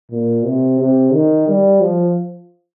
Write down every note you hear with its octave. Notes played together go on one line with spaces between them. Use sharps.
A#2
C3
C3
D#3
G3
F3